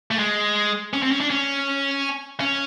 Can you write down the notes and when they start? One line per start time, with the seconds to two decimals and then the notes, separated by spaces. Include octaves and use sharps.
0.11 A3
0.19 G#3
0.93 C#4
1.03 C4
1.11 C#4
1.20 D4
1.30 C#4
2.40 C#4